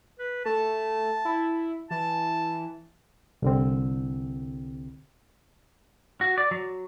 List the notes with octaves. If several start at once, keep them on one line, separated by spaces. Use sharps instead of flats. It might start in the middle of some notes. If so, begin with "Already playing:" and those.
B4
A3 A5
E4
E3 A5
C2 D3 C4
F#4
D5
F#3